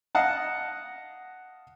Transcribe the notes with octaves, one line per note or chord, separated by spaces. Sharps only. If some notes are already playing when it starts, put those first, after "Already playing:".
D#5 F5 F#5 A5